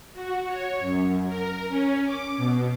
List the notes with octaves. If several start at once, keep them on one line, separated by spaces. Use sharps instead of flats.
F#4
C#5
F#2
A#4
C#4
D6
B2